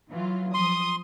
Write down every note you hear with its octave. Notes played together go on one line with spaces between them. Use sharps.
E3 F#3 F4
F3 C6 D#6